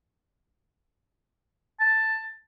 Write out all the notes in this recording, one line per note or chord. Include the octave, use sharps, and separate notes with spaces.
A5